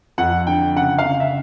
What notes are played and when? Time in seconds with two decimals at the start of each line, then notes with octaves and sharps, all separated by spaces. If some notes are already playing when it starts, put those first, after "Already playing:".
0.18 F2 F#5
0.47 D3 G5
0.76 C#3 F#5
0.98 F5
1.06 C#3
1.20 E5